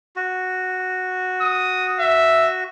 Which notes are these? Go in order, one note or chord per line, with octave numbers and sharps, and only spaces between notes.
F#4
D#6
E5